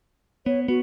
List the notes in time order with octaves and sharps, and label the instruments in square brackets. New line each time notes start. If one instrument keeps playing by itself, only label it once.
[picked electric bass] B3 [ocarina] C#5
[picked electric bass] B3 [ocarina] F#4